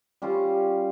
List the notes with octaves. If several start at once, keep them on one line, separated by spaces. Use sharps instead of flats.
G3 C#4 F4 C5